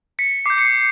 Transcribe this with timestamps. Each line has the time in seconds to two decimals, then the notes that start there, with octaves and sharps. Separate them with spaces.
0.19 B6 C#7
0.45 D6 G6 C7
0.58 C#7
0.65 C7